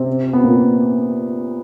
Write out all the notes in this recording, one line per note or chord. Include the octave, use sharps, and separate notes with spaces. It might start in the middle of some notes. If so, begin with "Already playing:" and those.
Already playing: C3 C4
C4
B3
A#2 A#3